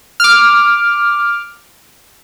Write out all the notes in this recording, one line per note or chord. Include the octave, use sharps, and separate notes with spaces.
D6 F6